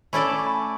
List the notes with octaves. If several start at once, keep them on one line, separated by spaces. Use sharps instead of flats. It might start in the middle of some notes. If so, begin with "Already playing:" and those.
A3 C#4 E4 A4 D5 B5
D6
C#6
B5
A5